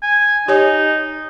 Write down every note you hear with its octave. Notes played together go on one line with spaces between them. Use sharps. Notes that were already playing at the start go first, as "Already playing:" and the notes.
G#5
D#4 G4 C#5 G#5